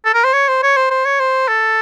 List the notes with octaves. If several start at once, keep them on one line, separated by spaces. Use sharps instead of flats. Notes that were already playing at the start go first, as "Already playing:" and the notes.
A4
A#4
C5
C#5
C5
C#5
C5
C5
C#5
C5
A4